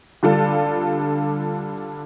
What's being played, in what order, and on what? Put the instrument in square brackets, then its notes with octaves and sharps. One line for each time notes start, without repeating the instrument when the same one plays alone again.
[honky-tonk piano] D3 G3 D4 F4 A4